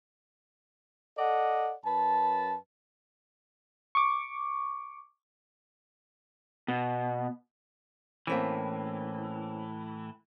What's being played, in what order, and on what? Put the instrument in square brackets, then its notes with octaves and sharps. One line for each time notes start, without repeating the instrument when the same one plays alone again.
[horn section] A4 D5 D#5 F#5
F#2 B4 A5
[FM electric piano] C#6 D6
[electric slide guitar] B2
[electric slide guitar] A2 E3 [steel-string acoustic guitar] A#3 C4 C#4